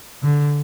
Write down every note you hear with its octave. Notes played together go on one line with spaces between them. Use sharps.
D3